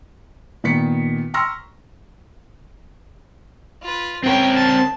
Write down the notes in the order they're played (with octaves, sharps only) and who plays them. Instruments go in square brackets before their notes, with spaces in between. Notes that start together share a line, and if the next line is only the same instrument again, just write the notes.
[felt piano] A#2 D#3 B3 B6 C#7
A#5 C6 C#6 E6 F6 A#6
[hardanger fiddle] F4 B4
[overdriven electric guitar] C4 A#4 [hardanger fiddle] C#4 G5
[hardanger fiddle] A5